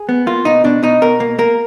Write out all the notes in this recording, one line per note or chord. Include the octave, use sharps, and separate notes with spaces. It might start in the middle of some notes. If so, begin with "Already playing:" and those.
Already playing: G#4
B3
A#3 F4
B2 D#4
B2 D4
B2 D#4
B2 A#4
A#3
A#3 A#4